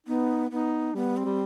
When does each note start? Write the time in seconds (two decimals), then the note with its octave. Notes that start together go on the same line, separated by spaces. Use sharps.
0.06 B3 D#4
0.51 B3 D#4
0.94 G3 B3
1.17 C4
1.25 G3